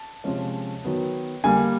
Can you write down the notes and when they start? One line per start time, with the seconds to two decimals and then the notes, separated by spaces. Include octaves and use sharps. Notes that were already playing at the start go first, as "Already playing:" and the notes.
Already playing: A5
0.24 C3 F3 G#3 C#4
0.84 D#3 F#3 B3
1.44 D3 G3 A#3 G#5